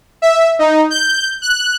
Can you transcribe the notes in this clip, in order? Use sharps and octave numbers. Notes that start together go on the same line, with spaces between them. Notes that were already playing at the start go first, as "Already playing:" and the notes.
E5
D#4
G6
F#6